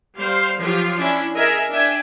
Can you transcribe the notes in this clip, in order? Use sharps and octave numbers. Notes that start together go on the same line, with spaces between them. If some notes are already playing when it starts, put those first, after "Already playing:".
G3 C5 F5
F3 F#3 F4 G4
C#4 D4 E4
G#4 A#4 D#5 E5 G#5
D4 E5 G5 G#5